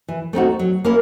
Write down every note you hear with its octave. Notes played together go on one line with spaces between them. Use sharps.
E3
A3 C4 D#4 F#4
F#3
A#3 C#4 E4